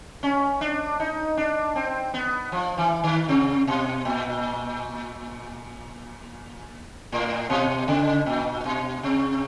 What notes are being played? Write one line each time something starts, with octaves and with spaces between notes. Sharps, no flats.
C#4
D4
D#4
D4
C4
B3
F3
E3
D#3
C3
B2
A#2
A2
B2
C#3
A#2
B2
C3